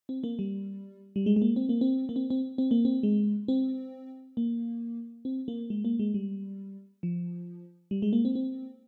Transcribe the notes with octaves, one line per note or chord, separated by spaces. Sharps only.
C4
A#3
G3
G3
G#3
G#3
A#3
C4
A#3
C4
A#3
C4
C4
C4
A#3
C4
G#3
C4
A#3
C4
A#3
G#3
A#3
G#3
G3
F3
G3
G#3
A#3
C4
C4